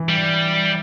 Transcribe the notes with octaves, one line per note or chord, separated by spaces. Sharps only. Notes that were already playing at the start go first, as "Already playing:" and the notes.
Already playing: E3
G3